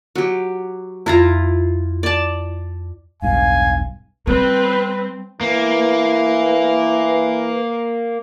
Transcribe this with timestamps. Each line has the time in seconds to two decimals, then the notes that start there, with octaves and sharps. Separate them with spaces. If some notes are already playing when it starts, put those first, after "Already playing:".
0.15 F#3 G4
1.06 F2 E4 F4 A#5
2.03 D5 A5
3.22 E1 B1 G2 F5 G#5
4.27 G3 C4 B4
5.41 E3 A#3 B4